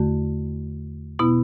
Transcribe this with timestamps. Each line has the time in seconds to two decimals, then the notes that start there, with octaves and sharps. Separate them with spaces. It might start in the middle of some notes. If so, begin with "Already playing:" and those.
Already playing: E2 D3 A3 F#4
1.19 B2 B3 E4